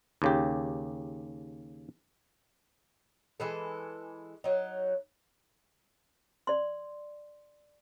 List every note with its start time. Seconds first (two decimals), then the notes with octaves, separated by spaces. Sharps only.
0.22 D#2 C#3 G4
3.40 E3 G#3 A4
4.44 F#3 D#4
6.47 D5 C6